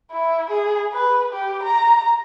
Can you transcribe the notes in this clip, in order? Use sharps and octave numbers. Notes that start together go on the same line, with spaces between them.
E4
G#4
B4
G4
A#5